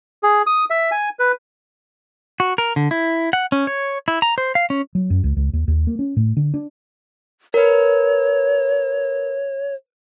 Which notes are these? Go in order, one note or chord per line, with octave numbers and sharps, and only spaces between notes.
G#4
D#6
E5
G#5
B4
F#4
A#4
D3
E4
F#5
C#4
C#5
E4
A#5
C5
F5
C#4
F#3
F#2
C#2
C#2
D#2
D#2
A#3
C#4
A2
D3
D4
A#4 B4 C#5